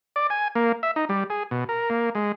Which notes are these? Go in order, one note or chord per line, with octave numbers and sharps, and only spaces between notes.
D5
G#5
A#3
E5
D#4
G3
G#4
B2
A#4
A#3
G#3